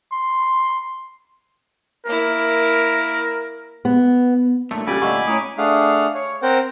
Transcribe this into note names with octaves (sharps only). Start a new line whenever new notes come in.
C6
A#3 E4 A#4
B3
G2 A#2 A3
A#1 C#3 G3 A4 G#5 B5 D6
D2 A#2 G3 A4 D#5 F5 F#5 C#6
A2 C#4 A#5 D#6
A3 D4 G#4 F5 F#5
C#5
C4 A#4 C5 F#5 G5